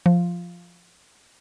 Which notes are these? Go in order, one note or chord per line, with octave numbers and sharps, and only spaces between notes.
F3